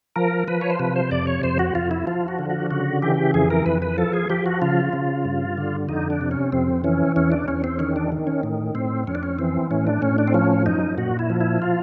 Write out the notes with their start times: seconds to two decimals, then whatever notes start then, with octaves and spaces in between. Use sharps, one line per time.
0.16 F3 A#4
0.48 F3 B4
0.61 C#5
0.71 C5
0.79 C3 B4
0.96 C5
1.11 F2 D5
1.27 C#5
1.43 F2 C5
1.59 F#4
1.75 F2 F4
1.91 E4
2.07 F3 F4
2.28 F#4
2.39 D3
2.50 F#4
2.71 C#3 F#4
3.02 E3 G4
3.34 F2 G#4
3.50 A#4
3.66 F2 B4
3.82 B4
3.98 F3 A4
4.13 G#4
4.30 F3 G4
4.46 F#4
4.62 C#3 F4
4.93 C#3
5.25 G2
5.57 D3
5.89 F2 D#4
6.10 D4
6.21 C3
6.31 C#4
6.52 F2 C4
6.84 E3 C#4
7.16 E2 C#4
7.32 D4
7.48 E2 C#4
7.64 C4
7.79 D#3 C#4
7.96 D4
8.12 D#3
8.27 C#4
8.43 A2
8.75 A2 C4
9.07 F2 C#4
9.15 D4
9.23 C#4
9.39 E3 C4
9.71 A2 C#4
9.87 D4
10.02 A2 C#4
10.18 D4
10.28 C4
10.34 F3 C#4
10.66 F#2 D#4
10.98 A#2 F#4
11.19 E4
11.30 F3
11.40 E4
11.62 F4